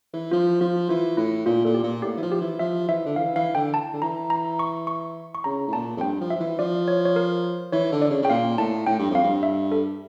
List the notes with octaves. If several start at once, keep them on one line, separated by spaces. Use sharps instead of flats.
E3
F3 F4
F3 F4
E3 F4
A2 E4
A#2 F4
A#2 A4
G4
A#2
A2 G4
E3
F3
G4
E3
F3 E5
E3 E5
D3
E3 F5
E3 F5
D3 G5
A5
D3
E3 A#5
A#5
C#6
C#6
C#6
C#3 A#5
A2
A#2 A5
F2
G2 G5
F3
E5
F3
E3
F3 D5
C#5
C#5
A#4
E3 C#5
D3
D5
C#3
C#3 G5
A#2 F5
A2 A5
A2 G5
G2
F2 F5
G2
E5
A4